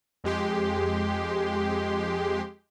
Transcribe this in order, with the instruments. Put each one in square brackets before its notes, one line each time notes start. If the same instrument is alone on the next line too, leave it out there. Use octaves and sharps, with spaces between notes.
[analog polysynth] F2 G#3 G4 C6